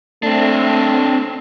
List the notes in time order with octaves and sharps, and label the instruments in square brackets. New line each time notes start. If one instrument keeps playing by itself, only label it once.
[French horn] A3 [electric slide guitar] C4 D4